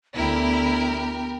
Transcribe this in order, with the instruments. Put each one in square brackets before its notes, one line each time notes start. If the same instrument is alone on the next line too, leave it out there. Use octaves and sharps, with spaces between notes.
[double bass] D2 [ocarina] B3 [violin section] E4 [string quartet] G4 A#4